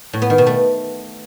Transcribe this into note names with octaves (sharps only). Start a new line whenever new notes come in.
A2
B3
D#3
B2
A3